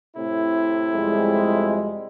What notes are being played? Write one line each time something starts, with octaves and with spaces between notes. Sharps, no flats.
A2 C3 E4
F2 G3 G#3